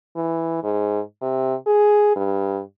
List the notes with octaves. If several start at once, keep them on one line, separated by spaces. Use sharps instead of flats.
E3
G#2
C3
G#4
G2